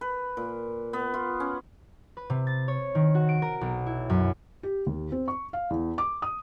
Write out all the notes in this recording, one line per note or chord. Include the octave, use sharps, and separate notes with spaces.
B4
A#2
B3
F4
C#4
B4
C3
A6
C#5
D#3
F#4
D7
A#4
B1
E4
F#2
G4
D#2
C4
C#6
F5
E2
D6
D#6